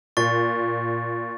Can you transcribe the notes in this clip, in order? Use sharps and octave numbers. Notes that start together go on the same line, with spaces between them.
A#2 C#6 A6